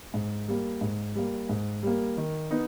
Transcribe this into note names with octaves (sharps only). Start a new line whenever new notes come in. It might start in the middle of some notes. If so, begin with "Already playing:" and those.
G#2
G3 A#3
G#2
G3 A#3
G#2
G3 A#3
D#3
B3 D#4